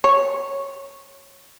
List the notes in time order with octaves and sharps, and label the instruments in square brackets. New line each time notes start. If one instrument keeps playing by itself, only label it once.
[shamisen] C#5